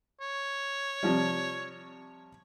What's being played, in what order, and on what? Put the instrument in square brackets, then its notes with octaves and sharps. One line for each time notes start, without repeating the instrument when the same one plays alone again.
[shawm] C#5
[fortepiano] C3 F3 G3